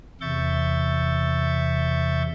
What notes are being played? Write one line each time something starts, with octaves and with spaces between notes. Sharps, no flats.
E2 C3 E5 C#6 G6 A6